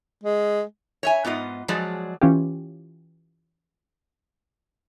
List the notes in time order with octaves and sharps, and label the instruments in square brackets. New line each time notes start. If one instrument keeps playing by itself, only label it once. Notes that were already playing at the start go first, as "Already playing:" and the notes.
[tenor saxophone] G#3
[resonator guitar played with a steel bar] C#5 E5 G#5
G#2 B3 F4 D#5
F3 F#3 G#3 G#4 D5
[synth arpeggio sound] E3 C#4 F4 G4